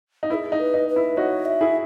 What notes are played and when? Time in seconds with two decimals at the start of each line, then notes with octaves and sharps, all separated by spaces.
0.23 D#4
0.30 E4 B4
0.34 G#4
0.52 D#4
0.59 B4
0.74 D#4
0.89 B4
0.96 E4
1.17 D#4 F#4 C#5
1.45 E5
1.61 E4 G#4